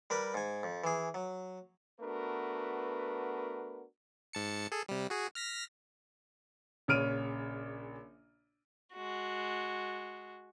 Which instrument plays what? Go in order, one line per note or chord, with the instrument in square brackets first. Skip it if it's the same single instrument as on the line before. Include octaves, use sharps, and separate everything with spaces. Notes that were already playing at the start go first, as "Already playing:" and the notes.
[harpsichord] G3 A#4 B4
G#2 G#5
F2
E3 G#4
F#3
[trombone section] A3 B3 D4 F#4 A#4 B4
[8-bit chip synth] G#2 A5 C#7
G#4 A4
C3 G3
F#4 G#4
F6 A#6 B6
[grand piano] A#1 C#3 C#5 F6 D7 D#7
[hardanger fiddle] G#3 F#4